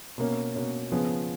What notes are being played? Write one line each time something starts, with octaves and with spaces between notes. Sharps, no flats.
B2 A#3 C#4
B2 A#3 C#4
C#3 F3 B3 G#4